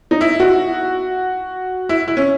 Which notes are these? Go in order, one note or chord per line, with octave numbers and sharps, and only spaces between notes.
D#4
E4
F#4
E4
E4
C#4